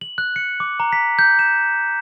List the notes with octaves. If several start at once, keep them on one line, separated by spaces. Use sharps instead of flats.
F#7
F#6
C#7
D6
A#5
B6
G6
E7